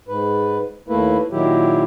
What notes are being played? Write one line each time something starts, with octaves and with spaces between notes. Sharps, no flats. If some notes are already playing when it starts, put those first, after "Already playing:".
G#2 B4
D#2 A3 A#3 E4 B4
A#2 D#3 F#3 E4 G4